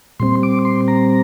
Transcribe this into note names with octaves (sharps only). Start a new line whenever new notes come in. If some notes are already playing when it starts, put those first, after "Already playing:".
A#2 G3 C4 C6
D6
C6
A#5